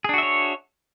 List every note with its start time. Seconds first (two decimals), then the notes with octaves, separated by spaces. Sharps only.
0.04 G#4
0.09 D4
0.14 F#4
0.18 E5
0.23 C#5